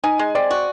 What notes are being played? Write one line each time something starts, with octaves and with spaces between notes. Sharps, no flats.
D#4 G#5
G#3
C4 D5
F#4